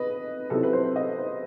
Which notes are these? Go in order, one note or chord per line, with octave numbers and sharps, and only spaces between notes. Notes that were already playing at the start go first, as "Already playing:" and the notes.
Already playing: B4 D#5
C3 F#3 C4 E4 A4
B4
C5
D#5
C5